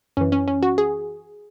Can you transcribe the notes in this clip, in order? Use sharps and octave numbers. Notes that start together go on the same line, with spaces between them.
F#2 E3 C#4
C#4
C#4
F#4
G#4